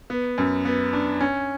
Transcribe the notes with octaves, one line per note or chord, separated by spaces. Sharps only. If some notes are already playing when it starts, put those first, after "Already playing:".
B3
F#2
B3
D4
C#4